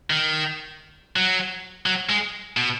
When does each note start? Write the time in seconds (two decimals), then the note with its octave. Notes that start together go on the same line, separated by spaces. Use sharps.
0.10 D#3
1.16 F#3
1.86 F#3
2.09 G#3
2.57 B2